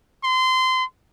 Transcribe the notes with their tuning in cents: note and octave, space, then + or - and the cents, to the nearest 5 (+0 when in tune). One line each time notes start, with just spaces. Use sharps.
C6 -25